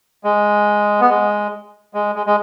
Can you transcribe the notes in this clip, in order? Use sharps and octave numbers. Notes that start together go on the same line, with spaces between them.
G#3
B3
G#3
G#3
G#3
G#3